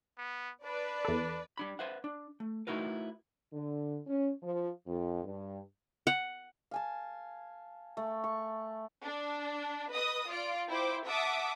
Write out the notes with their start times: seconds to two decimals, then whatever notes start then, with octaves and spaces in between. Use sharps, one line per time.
0.18 B3
0.64 D4 B4 D5
1.05 E2 A4
1.57 G3 D4 B5
1.79 B4 C5 E5 F#5
2.04 D4
2.40 A3
2.67 A3 D#4 E4 F#4 A#4 B4
3.53 D3
4.07 C#4
4.43 F3
4.87 F2
5.24 G2
6.07 F#5
6.71 F5 G#5 A5
7.97 A3
8.24 C#6
9.03 D4
9.91 B4 D#5 D#6
10.29 F4 D5 D7
10.69 E4 C5 G5 D6
11.07 E5 F#5 A5 D6 D#6